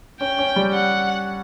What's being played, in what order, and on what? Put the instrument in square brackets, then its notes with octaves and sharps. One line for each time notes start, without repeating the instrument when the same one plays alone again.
[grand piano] C#4 [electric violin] G5
[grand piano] C#4
G3
[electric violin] F#5